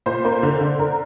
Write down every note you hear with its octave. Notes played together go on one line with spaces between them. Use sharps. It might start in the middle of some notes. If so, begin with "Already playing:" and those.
A#2 C5
A#3 C5
D3
D3
D3 A#4